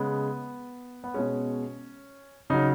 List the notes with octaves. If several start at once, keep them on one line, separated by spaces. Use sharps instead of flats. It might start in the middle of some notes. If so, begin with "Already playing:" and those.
Already playing: C#3 G#3 B3
B3
B2 G#3 C#4
C#3 F#3 D#4